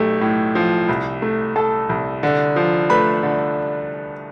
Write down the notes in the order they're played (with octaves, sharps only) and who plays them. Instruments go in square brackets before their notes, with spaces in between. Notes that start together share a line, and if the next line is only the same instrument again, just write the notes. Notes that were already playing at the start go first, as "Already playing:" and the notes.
Already playing: [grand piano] B1 A3 G4
A2
F3
C2
A3
A3 A4 A5
C2
D3
F3
A3 B4 B5
D3